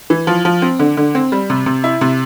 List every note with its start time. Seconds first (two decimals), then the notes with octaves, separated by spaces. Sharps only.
0.10 E3
0.27 F3
0.45 F3
0.62 C4
0.79 D3
0.97 D3
1.15 C4
1.32 G3
1.50 C3
1.66 C3
1.84 E4
2.01 C3